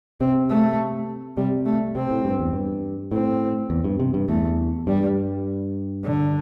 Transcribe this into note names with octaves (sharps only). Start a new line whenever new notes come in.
C3 C4
A3
C3 G3
A3
C3 C4
A2
G2
E2
G2
A2 C4
E2
G2
C3
G2
E2 A3
G2 G3
D3